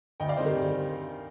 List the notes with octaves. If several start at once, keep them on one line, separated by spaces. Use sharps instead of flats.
D2 D#5 G5
D5 F5
C3 D#3 G3 C5 D#5
G4 A#4
D2